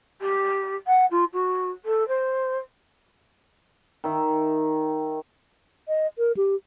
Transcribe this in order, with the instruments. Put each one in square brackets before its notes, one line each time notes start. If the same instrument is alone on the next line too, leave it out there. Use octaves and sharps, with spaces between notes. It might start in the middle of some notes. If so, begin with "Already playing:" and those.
[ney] G4
F#5
F4
F#4
A4
C5
[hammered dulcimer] D#3 E5
[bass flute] D#5
A#4
G4